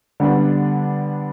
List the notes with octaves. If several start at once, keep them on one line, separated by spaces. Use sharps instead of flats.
D3 G3 B3 D4